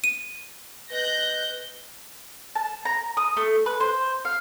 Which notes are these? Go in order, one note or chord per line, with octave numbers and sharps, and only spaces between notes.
D#7
B4 D#5 F#6 G6 A#6
A5
A#5
D#6
A3
B4
C5
F5